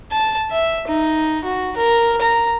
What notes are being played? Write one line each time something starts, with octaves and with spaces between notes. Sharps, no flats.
A5
E5
D#4
F#4
A#4
A#5